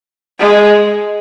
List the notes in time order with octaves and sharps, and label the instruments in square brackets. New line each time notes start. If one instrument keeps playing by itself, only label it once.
[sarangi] G#3